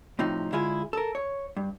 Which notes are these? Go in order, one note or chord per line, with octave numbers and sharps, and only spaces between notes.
A2 C3 F3 D#4
D3 G#3 E4 F4 G#4
A4 A#4
C#5
G2